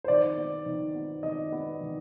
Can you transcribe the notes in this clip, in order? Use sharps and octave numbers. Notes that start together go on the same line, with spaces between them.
C5
D#3 D5
B3
D#3
B3
D#3 D#5
B3
D#3